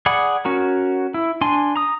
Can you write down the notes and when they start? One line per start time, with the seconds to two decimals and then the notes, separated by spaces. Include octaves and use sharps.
0.06 G#4 D5 F#5 B5
0.45 C#4 F#4 A#4
1.14 E4
1.41 D4 G#5 C6
1.76 A#5 D#6